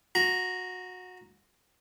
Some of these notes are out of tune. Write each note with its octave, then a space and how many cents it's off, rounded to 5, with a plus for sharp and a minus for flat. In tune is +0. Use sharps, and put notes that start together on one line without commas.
F#4 -20 A#5 +0